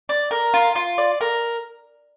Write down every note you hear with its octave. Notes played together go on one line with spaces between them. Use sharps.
D5
A#4
F4
F4
D5
A#4